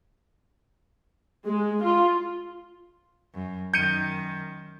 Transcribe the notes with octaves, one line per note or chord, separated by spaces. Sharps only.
G#3
F4
F#2
F#2 D#3 G6 C#7 D#7